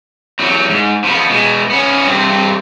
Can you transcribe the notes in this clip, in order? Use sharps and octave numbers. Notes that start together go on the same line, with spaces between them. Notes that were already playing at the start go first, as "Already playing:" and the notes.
E2 F#3
G#2
F3 B3
B2 G#3
B3 C#4
G2 C4